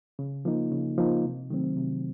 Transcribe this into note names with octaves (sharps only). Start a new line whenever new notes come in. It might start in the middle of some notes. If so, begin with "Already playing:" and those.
C#3
F3 A#3 D#4
C#3
F3 A#3 D#4
C3
D#3 F#3 A3 C4
C3